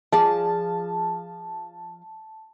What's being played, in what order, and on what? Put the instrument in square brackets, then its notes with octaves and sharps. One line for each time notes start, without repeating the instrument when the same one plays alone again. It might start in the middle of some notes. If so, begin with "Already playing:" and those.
[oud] F3 G#4 D5 [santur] A5